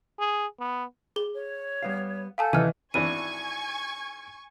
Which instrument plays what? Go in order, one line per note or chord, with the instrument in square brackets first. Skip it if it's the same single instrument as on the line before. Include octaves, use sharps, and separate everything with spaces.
[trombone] G#4
B3
[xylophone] G#4 G7
[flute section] C#5
[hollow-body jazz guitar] G3 B3 F5
[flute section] A4 F#5 G6 [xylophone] F5 G#5 A5
[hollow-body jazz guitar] C3 D#3 [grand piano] E3 [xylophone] D#5 F6 D#7
[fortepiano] G#1 E3 D4 [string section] G#5 C#6 G#6 [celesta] D#7